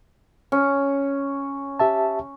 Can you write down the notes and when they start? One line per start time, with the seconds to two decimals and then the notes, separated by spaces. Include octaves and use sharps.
0.52 C#4
1.79 G4 E5 A5